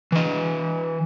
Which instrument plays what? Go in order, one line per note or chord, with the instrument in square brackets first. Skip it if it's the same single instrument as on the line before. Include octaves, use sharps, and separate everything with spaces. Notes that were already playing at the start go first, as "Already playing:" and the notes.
[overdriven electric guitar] E3 D#5